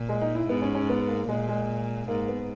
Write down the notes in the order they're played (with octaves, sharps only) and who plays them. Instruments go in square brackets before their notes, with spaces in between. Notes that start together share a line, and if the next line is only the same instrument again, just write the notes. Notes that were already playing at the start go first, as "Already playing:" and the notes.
Already playing: [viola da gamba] A#2
[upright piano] G#3
D#4
E4
[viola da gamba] G#2 [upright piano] B3
[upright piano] C#4
C#4
B3
A#3
[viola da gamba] A#2 [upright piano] G#3
[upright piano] G#3
[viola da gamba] G#2 [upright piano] A#3
[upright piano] B3